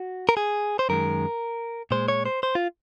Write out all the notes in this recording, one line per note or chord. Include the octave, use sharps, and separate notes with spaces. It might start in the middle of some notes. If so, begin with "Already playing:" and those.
Already playing: F#4
A#4
G#4
C5
F#2 D#3 G#3 A#4
A#2 G#3 C5
C#5
C5
C5
F4